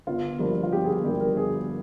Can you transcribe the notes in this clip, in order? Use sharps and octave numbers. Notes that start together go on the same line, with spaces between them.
G1 F4
G2 F3 A#3
F4
G1 G4
G#4
G4
G2 F3 A#3 G4
A#4
G1 G#4